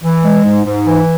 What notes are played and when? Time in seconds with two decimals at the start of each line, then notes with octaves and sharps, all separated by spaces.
0.03 E3
0.24 G#3
0.44 G#2
0.65 G#2
0.86 E3